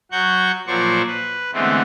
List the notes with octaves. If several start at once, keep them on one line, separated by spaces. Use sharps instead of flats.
F#3 F#4 F#5 C#6 G6
A#2 F3 F#3 C5 D5 C#6
B4
D3 E3 G#3 A3 B3 C4